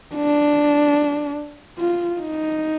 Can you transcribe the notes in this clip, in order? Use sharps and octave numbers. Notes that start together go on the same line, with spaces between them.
D4
F4
D#4